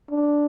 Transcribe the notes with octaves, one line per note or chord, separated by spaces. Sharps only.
D4